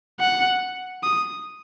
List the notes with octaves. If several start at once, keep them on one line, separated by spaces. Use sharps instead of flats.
F#5
D#6